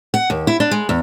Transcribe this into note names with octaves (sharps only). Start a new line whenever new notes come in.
F#5
D#2
E4
D4
G#3
E2